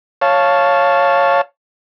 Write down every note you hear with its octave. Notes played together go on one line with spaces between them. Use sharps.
C#5 F5 A5